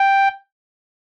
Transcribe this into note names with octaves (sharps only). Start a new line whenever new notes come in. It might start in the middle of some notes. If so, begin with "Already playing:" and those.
Already playing: G5